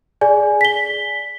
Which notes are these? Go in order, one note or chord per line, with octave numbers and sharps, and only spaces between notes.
G#4 D5 G#5
B6 G7